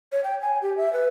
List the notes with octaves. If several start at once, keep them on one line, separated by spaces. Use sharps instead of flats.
C#5
G5
G#5
G4
E5
B4